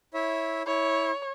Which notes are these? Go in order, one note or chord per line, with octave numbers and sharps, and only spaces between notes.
E4 C#5 E5
E4 C#5